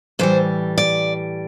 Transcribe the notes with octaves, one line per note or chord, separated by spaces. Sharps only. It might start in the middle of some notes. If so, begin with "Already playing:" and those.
A2 E3 G3 C5
D5